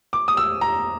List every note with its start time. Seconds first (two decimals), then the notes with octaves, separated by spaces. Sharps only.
0.13 D6
0.28 D#6
0.37 E6
0.61 A#5